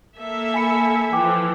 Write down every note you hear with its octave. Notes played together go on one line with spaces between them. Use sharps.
A#3 A4 E5
G#5 B5 C#7
E3 F3 G5 D6